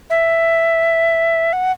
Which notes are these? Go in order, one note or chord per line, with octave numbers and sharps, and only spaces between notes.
E5
F#5